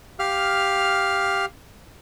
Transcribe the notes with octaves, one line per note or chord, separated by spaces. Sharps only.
G4 F5 F6